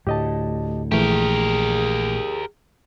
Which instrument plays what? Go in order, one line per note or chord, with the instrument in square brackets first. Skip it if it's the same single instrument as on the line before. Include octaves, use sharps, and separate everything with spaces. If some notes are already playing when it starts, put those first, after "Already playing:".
[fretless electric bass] D2 A2 [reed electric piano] G4 D#5 A5
[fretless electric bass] A#1 [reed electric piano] E3 A3 [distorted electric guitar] G4 A#4 [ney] G#4